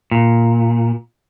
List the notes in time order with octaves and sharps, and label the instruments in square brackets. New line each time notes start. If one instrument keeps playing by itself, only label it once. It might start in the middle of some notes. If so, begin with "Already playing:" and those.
[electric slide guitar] A#2